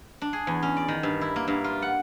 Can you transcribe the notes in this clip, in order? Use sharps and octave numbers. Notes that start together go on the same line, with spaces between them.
D4
G#4
E2
C#4
D5
D#3
G2
E4
A#3
G2
F4
F#5